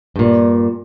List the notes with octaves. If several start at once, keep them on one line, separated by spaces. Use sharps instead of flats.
G2 A#2